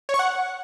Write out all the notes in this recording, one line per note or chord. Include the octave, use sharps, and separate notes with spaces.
C#5
C#6
F#5